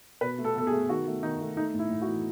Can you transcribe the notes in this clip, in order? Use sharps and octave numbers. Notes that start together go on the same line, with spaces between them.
B2 B4
A3
A4
B2 A4
G#4
A3
D#3 F#4
A3
D#3 D#4
A3
A3 D#4
A2
E4
A2
F#4
E3